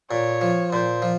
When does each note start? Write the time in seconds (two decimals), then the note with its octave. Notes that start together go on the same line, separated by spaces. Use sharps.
0.11 A#2 C#5
0.41 F3
0.72 A#2 C5
1.02 F3